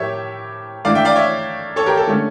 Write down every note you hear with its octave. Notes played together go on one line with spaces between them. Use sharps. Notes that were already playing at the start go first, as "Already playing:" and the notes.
Already playing: A2 F3 G4 A#4 C#5 E5
E3 A3 D4 D5 F5
E5 G5
D5 F5
C#5 E5
A4 C#5
G4 A#4
A4
D3 A3 C#4